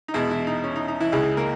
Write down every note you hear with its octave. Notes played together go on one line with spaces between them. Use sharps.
D#4
E2 B2 E3 G#3 E4
E3 E4
D#4
C#4
D#4
D#4
E3 E4
C#2 C#3 E3 G#3 G#4
A#3 A#4